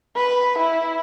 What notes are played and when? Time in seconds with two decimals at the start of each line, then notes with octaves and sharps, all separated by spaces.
0.16 B4
0.59 E4